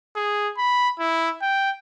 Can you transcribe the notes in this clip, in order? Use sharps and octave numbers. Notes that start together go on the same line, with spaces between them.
G#4
B5
E4
G5